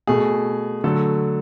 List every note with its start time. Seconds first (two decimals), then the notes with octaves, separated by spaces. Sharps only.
0.07 B2 A3 G#4
0.84 D3 F#3 A3 A4